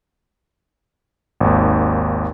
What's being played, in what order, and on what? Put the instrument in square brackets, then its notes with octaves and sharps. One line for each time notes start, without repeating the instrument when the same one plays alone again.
[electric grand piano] G#1 D#2